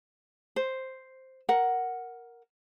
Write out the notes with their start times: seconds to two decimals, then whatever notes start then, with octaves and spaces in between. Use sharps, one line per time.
0.56 C5
1.49 A#4 F#5